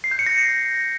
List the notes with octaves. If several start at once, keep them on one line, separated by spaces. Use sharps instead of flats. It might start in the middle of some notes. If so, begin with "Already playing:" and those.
C7
G6
C#7
A#6